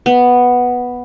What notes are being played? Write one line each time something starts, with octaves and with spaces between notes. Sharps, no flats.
B3